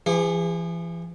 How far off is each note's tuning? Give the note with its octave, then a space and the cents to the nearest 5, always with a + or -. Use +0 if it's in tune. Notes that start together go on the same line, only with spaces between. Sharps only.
E3 +40 G#4 -35